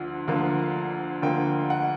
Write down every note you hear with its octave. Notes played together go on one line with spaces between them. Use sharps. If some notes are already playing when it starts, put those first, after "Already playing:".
Already playing: D2 D3 F3
D2 D3 F3 A#3
D2 D3 F3 A#3 G5
F#5